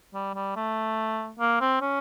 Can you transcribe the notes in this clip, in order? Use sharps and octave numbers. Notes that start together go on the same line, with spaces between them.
G3
G3
A3
A#3
C4
C#4